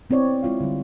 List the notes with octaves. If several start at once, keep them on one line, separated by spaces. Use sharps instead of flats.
B3 C4 E4 C#5 D5
G#3 E4 F4 F5
D3 G3